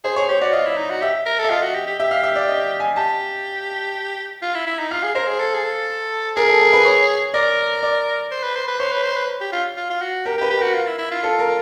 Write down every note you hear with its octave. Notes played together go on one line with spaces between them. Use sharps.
G#4 C5
G#4 C#5
G4 C#5
F#4 D5
F4 D#5
E4
D#4
F#4
G4 E5
A#4
A4
E5
F4 D#5
F#4
G4
G4
G4 E5
F5
E5
D5
D#5
G#5
G4 A5
F4
E4
E4
D#4
F4 F5
G#4
A#4 C5
G#4
A4
G#4
A4
G#4 A#4
A4
A#4
B4
C#5
A#4 D5
D5
C5
B4
C5
B4
C5 C#5
B4
C5
B4
G4
F4
F4
F4
F#4
G4 A#4
G4
B4
G4
F#4 A#4
F4
E4
E4
F4
A4
A#4